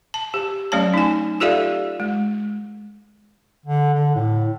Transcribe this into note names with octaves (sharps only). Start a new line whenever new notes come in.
A5
G4
F#3 A3 C#4 C#5 A5
D#4 G#5
F4 G4 A4 D5 E5 F5
G#3
D3
D3
A2